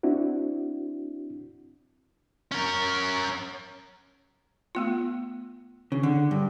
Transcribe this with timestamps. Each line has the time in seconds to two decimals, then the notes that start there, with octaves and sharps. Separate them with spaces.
0.03 C4 D4 E4 F#4
2.52 C#4 A#4
4.75 A3 B3 F4
5.92 C#3
6.03 D3
6.31 G2